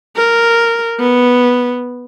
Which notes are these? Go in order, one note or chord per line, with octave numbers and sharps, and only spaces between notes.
A#4
B3